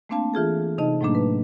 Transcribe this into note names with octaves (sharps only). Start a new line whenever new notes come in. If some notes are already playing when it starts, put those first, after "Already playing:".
A3 A#3 C4 D4 F5 A5
E3 F4 G#4 A4
C3 D#4 D#5 A5
A2 F#3 A3 A#3 D4
B4